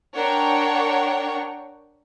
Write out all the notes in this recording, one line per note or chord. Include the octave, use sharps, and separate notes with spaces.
D4 A#4 C#5 F#5 G5 C#6